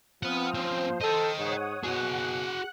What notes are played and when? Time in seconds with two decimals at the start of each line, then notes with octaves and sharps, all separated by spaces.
0.23 F3 C4 B4 F#5 D#6 F6
0.55 C4 C#4 C5
1.01 A4 D#5 G5
1.39 G#2 C#5 F#5 D#6
1.84 B2 F#4 G#4 F#5 F#6